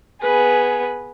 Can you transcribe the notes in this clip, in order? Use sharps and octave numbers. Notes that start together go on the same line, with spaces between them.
B3 G#4 B4